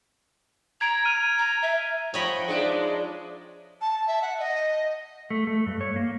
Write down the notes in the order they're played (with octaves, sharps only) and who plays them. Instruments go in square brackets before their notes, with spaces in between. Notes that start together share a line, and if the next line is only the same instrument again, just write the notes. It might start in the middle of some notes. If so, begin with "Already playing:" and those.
[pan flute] A#5 [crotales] G#6 D7
[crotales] F6 D#7
[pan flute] A#5
E5
[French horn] F3 [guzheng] C#5 D#5 B5 [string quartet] F#5 G5 C#6
[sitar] G#3 D4 [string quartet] D#4 D5 E5
[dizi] A5
E5
F#5
D#5
[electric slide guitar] A3
A3
G2
C#5
A#3